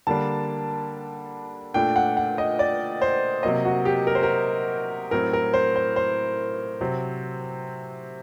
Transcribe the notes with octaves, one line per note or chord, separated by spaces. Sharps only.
D3 G3 A#3 D4 A5
A#2 A3 D4 G5
F#5
F#5
D#5
D5
C5
C3 F#3 A#3 D#5
F#4
G4
A#4
C5
A#4
A2 F#3 C4 A#4
A#4
C5
C5
C5
C3 F#3 C4